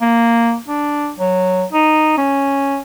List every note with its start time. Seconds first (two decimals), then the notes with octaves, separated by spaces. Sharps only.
0.01 A#3
0.68 D4
1.19 F#3
1.73 D#4
2.18 C#4